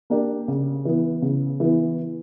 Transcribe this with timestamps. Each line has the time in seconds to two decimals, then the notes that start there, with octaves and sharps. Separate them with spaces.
0.10 A#3 D4 G4 A#4
0.48 C#3
0.85 E3 B3
1.22 C#3
1.60 E3 B3